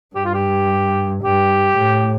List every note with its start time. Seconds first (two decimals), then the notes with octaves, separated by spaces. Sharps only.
0.15 G2 G4
0.25 F4
0.34 G4
1.23 G2 G4
1.77 A2